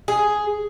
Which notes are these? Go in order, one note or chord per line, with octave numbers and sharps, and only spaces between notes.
G#4